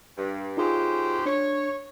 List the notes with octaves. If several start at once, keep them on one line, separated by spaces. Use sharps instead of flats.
G2
F#2 D#4 F4 G4 G#4 C5
D4 C#5